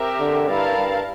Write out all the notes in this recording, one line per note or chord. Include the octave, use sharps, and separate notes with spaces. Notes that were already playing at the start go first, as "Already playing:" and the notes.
Already playing: C4 G4 A#4 E5
D3
G2 E4 A#4 F5 A5
G2